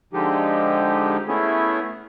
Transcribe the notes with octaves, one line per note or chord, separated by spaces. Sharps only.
D3 F3 G#3 D#4 G4
A3 B3 C#4 E4 G#4